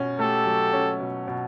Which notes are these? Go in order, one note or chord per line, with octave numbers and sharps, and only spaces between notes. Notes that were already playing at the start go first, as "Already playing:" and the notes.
Already playing: B2 C#4
A3 G4 A4
F#3
C#4
B2
B2